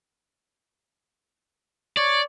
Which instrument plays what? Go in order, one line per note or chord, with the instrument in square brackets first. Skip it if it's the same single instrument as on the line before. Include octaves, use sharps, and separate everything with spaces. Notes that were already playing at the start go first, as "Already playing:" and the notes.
[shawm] C#5 [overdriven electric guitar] D5